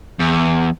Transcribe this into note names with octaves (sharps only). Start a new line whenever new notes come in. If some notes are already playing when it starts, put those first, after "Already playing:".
E2